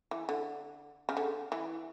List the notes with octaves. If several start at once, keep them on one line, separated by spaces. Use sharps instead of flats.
E3
D3
C#3
D3
E3